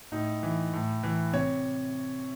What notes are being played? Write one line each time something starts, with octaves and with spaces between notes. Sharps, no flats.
A2 D#4
E3
A2
E3
C3 C#5